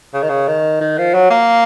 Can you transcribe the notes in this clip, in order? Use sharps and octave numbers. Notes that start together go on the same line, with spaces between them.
C#3
D#3
C#3
D#3
D#3
F3
F#3
A#3